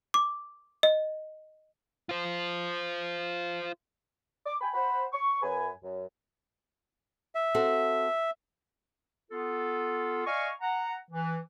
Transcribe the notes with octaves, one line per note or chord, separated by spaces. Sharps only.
D6
D#5
F4 C5
D6
G5 G#5 B5
C5 F#5 B5
C#6
F#2 B4 G#5
F#2
E5
C4 F#4 A4
B3 F4 A4
D5 D#5 F5 G#5 C#6
F#5 A#5
E3